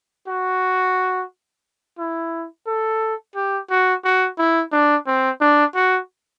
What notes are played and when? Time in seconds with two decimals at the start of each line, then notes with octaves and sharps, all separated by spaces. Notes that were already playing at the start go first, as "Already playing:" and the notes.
0.28 F#4
1.98 E4
2.67 A4
3.35 G4
3.70 F#4
4.04 F#4
4.39 E4
4.72 D4
5.06 C4
5.41 D4
5.75 F#4